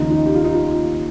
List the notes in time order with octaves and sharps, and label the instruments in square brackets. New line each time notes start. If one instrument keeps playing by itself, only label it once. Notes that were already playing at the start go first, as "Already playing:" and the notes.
Already playing: [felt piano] D#2 C#3 F3 D#4
D#4
G4
F4
D#4
F4